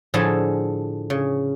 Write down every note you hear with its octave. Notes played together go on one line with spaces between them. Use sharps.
A2 D3 F3 G#4 A4 A5
C#3